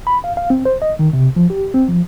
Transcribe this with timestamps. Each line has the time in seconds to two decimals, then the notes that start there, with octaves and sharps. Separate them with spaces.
0.07 B5
0.24 F5
0.37 F5
0.50 C4
0.65 C5
0.82 D#5
0.99 D#3
1.13 C3
1.36 F3
1.50 G4
1.74 C4
1.89 F3